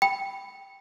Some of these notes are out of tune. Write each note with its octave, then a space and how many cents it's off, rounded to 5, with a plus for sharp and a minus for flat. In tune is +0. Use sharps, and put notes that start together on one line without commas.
G5 +0 B5 +0